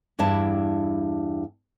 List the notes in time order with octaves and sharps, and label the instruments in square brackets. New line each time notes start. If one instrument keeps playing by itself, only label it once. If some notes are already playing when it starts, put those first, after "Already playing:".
[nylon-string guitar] E2 G2 D4 E4 A5